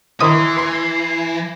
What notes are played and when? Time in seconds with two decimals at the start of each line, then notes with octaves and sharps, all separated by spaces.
0.21 D#3 E3 E4 A#4 C6 C#6 D#6
0.57 B4 C6 C7